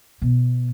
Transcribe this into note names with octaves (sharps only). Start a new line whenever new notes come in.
B2